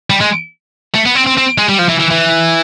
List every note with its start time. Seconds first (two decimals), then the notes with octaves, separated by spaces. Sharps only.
0.10 G3
0.21 G#3
0.95 A3
1.05 B3
1.15 C4
1.26 C4
1.37 C4
1.58 G#3
1.69 G3
1.79 F3
1.89 E3
2.00 E3
2.11 E3